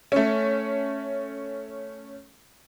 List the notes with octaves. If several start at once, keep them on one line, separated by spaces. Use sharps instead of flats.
A3 C#4